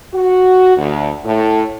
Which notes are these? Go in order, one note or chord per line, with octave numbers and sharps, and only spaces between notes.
F#4
D2
A2